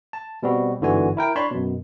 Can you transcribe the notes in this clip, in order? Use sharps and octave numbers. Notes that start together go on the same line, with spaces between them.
A5
B2 G3 C4 F#4
G1 G#2 D3 E3 F#4 G#5
E4 A#4 G5
D4 C#5 A5 B5 C6
F#2 B2